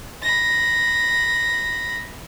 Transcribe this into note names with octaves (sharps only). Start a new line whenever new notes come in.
B5 A#6